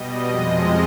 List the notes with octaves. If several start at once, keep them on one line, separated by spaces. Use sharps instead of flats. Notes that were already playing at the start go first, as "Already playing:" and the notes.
Already playing: B2 G3 D#5
F2 C3 F3 G#3 D#5